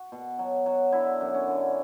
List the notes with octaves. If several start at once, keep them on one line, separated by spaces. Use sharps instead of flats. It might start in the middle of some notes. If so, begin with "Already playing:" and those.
Already playing: F#4
B2
F#3
F#3
D3 E4
F#2
C#4
D3